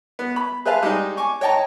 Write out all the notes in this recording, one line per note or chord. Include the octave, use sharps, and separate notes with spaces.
B3
B5
G#4 B4 C5 E5 F5 A5
G3 G#3 D#4 G#4
G#5 C#6 D6
C#5 D#5 G5 A5 A#5